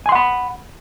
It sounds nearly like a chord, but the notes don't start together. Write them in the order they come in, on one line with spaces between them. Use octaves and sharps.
G#5 C6 F#5 B5